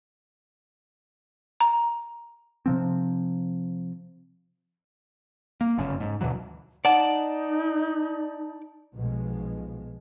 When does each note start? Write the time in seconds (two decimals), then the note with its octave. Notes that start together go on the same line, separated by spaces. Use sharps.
1.61 A#5
2.66 C3 F3 C4
5.61 A#3
5.78 G1 F#2 C#3
6.00 G#2
6.21 D2 B2 E3 F#3
6.85 D#4 D5 F#5 A5
8.94 B1 B2 F3 G#3